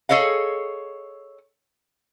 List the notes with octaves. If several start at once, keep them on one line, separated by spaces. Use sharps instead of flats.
G#4 A4 C#5 D#5 F5